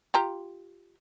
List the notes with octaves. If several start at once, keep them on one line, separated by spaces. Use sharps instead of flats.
F4 G4 A#5